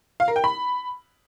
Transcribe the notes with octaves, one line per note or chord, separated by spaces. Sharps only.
F5
A#4
G5
B5